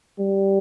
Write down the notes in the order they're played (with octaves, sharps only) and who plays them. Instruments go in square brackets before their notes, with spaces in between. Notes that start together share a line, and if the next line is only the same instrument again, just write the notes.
[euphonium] G3